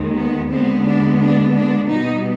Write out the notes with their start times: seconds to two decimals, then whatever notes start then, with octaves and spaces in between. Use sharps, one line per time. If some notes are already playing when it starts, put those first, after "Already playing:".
Already playing: D#2 D#3 G#3
0.16 B3
0.50 D#2 D3 G#3 B3 C4
0.85 D4
1.20 D4
1.54 D4
1.89 B2 G3 B3 D#4